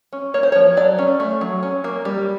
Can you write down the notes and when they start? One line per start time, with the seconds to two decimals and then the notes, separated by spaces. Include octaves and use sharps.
0.13 C#4
0.34 A#3 C#5
0.43 C5
0.52 C#5
0.55 F3
0.77 F#3 D5
0.99 C#4
1.20 A3
1.41 F#3
1.63 C#4
1.84 A#3
2.05 G3